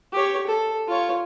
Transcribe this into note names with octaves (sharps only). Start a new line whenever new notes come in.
G4 C#5
A4
F4 C#5